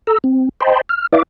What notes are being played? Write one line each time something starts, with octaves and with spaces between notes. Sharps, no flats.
A4 A#5 E6
C4
C5 D#5 G5 A5 B5 C6
F6
E4 B4 D5 E5 F5 D6